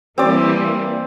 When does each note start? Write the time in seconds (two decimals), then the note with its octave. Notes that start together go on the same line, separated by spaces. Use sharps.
0.18 E3 G3 A#3 C4 D5